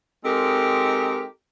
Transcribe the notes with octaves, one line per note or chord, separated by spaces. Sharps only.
G#3 C4 D#4 G4 A4 A#4